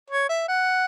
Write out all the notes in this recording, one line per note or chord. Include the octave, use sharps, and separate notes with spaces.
C#5
E5
F#5